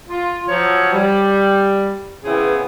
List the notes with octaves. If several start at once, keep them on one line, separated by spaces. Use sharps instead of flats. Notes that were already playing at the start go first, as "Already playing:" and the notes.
F4
F3 F#3 C#5
G3
C#3 E3 B3 C4 E4 G#4